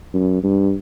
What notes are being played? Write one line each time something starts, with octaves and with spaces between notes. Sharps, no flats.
F#2
G2